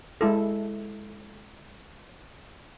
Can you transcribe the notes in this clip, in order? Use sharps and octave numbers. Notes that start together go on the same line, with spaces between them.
G#3 E4 A4